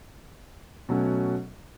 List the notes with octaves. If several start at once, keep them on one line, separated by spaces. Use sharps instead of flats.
B2 F#3 A3 C#4